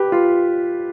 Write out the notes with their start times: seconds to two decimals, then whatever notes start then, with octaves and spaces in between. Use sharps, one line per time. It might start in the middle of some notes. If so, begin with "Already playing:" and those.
Already playing: G4 B4
0.12 F4